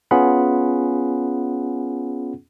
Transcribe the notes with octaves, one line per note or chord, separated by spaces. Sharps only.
B3 C#4 F4 G#4 F#5 B5